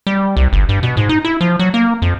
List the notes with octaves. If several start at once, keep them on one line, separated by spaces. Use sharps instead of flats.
G3
C2
G1
G2
B2
G#2
D#4
E4
F3
F#3
A#3
F2